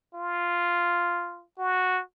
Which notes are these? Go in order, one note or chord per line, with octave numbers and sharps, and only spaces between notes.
F4
F#4